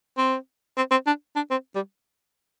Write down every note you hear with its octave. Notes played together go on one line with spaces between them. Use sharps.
C4
C4
C4
D4
D4
C4
G3